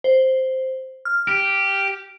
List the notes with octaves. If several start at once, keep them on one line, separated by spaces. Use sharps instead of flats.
C5
F6
G4